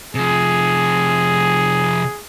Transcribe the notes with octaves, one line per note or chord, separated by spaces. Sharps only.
C3 F3 G#4